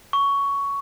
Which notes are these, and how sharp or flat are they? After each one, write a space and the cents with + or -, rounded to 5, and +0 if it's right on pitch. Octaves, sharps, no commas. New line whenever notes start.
C#6 +10